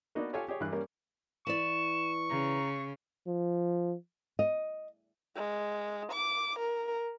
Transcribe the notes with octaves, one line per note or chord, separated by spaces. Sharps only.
A#3 B3 D4 D#4 F#4 D5
F4 G4 A4 C#5 F5 G#5
G4 G#4 C#5
G2 E3 A#4 D5 F#6
G3 A#3 C#4 A#4
E3 D5 C#6 E7
C#3 A#5
F3
D#5
G#3
D6
A#4